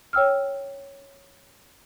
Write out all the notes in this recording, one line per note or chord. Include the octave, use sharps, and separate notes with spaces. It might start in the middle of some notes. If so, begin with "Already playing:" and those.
C#5 G5 E6 F6